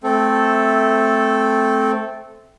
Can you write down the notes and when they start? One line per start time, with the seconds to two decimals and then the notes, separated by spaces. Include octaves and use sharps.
0.04 A3 C4 A4